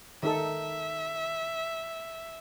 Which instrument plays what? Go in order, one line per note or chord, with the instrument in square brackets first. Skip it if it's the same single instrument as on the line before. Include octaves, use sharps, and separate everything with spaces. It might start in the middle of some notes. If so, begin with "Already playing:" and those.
[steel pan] D#3 D#4 A4 [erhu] E5